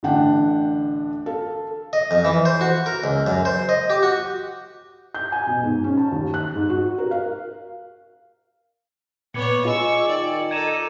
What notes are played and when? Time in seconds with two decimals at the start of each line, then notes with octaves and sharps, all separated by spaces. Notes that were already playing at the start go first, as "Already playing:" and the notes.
0.03 A1 D3 D4 F#5 G5
1.26 A4 F5
1.93 D#5
2.11 F2
2.25 E3
2.45 C5
2.61 F#4
2.86 A#4
3.04 C#2
3.27 F#2
3.45 C5
3.69 D#5
3.90 G4
4.03 F#4
5.15 G6
5.32 G#5
5.47 B2
5.63 G#2
5.84 C#4
5.97 A5
6.12 D#2
6.34 F#6
6.55 G#2
6.69 F#4
6.98 A#4
7.11 F5
9.34 A#2 B3 C#5 D6 G#6 C#7
9.65 G#3 F4 C#6 E6
10.07 D#3 D5
10.51 D#4 A4 G#6 D#7 E7